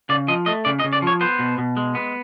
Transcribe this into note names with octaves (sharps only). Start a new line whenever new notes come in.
C#3 D5
F3 D#5
A3 D#5
C#3 D5
D#5
C#3
D5
F3 C#5
B3 C5
B2
B2
G#3
B3